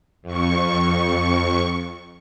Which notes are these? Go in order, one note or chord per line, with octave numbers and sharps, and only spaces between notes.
F2 C#6